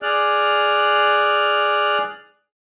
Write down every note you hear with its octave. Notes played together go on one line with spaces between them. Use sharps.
G#4 D5 F6 F#6